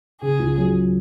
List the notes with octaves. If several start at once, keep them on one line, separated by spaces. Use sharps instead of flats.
C#3 G#4
C#2
F#3